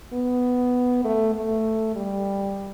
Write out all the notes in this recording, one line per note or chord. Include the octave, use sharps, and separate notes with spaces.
B3
A3
A3
G3